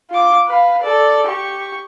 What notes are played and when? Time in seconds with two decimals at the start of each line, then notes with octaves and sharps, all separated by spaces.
0.10 F4 D6
0.48 B4 F5
0.82 A4 D5
1.27 G4 C#6